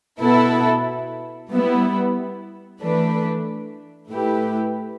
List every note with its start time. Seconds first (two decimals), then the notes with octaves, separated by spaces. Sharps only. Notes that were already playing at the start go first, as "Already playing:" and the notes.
0.21 B2 B3 E4 A4
1.50 G3 B3 E4
2.81 E3 A3 D4 B4
4.10 A2 A3 E4 G4 B4